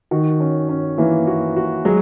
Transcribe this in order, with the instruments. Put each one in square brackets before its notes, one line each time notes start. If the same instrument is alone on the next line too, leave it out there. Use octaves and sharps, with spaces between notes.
[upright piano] D#3 [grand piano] F#4
[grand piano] C#4
C#4
[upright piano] E3 [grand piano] A#3
[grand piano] F#4
F#4
[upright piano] F#3 [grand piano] G#3